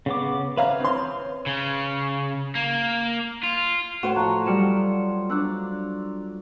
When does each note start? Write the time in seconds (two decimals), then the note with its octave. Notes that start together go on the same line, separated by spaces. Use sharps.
0.06 C#3 B3 D6
0.57 B4 C#5 E5 F5 A#5 F6
0.80 C4 C6
1.46 C#3
2.55 A#3
3.43 F4
4.03 A2 F#4 C5 C#5 E7
4.16 F3 D#5 A5 A#5 F#6
4.46 F#3 G3 D5 F6 C#7 E7
5.30 D4 D5 A#5 E6 F#6